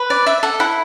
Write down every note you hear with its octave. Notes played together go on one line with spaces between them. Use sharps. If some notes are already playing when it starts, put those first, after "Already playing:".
Already playing: B4
D5
D5 E5
A4 F#5
E4 F#5